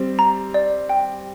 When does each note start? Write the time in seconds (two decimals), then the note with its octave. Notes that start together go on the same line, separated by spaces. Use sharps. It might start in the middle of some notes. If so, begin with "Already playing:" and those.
Already playing: G3 C4
0.19 A#5
0.54 D5
0.89 G5